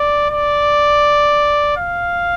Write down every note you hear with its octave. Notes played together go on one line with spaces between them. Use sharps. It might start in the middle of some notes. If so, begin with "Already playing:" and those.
Already playing: D5
D5
F5